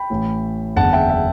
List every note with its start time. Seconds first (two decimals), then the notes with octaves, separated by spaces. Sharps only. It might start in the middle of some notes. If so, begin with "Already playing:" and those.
Already playing: G5 B5
0.10 A1 A2 E3
0.76 F#1 E2 D3 F#5 A5
0.93 E5 G5
1.10 E5